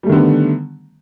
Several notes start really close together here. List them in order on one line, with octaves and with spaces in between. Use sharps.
G3 A3 D#3 D3 B3